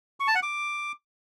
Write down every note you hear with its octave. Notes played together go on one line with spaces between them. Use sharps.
C#6
A5
F#5
D6